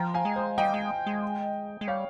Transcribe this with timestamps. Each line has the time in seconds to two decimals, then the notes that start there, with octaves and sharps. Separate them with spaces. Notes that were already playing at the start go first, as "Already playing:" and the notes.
Already playing: F3 G5 A#5
0.14 F5 G#5
0.25 G#3
0.36 C5
0.58 G3 D#5 G5
0.74 G#3
1.07 G#3
1.81 G#3
1.88 G3 C#5 F5